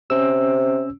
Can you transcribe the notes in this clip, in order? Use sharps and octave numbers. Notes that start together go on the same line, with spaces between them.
C3 C#4 E6